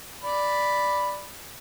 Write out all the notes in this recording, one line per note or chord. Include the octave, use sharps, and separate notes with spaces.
D5 B5